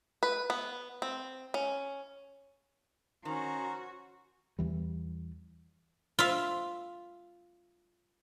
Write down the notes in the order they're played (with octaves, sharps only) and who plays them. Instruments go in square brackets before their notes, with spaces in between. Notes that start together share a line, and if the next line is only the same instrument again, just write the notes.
[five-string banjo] B4
B3
C4
C#4
[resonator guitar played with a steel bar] D#3 [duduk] C#4 [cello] F#4 [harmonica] C5 A#5
[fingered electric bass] E2 E3 G3
[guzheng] F4 E5